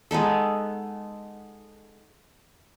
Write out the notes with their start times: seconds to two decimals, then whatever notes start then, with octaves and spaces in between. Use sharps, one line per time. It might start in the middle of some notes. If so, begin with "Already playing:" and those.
0.11 G#3 B3 D#4 A4